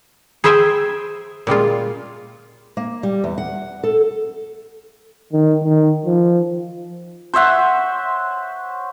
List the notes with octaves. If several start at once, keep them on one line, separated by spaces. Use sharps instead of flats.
G#4 B4 C5 E5 G5 G#5
A#2 G3 G#3 F4
A#3
G3
E2
F#5
A4
D#3
D#3
F3
C5 C#5 E5 F#5